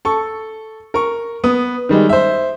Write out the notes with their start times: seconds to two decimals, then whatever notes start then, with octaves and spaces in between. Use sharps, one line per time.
0.05 A4 C#6
0.94 A#4 C#6
1.44 B3 D#6
1.89 D#3 G3 G#3
2.09 C5 E5